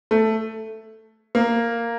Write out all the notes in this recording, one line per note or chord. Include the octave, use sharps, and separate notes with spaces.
A3
A#3